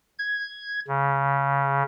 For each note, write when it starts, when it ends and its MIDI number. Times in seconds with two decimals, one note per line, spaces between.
0.18 0.80 92
0.88 1.83 49